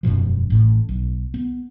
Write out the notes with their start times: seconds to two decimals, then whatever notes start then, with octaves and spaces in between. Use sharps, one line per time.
0.03 E1 F#2 B2 F3
0.50 A1 A2
0.89 B1
1.34 B3